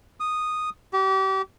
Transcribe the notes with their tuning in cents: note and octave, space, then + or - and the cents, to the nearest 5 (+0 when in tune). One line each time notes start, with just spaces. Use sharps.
D#6 -5
G4 -35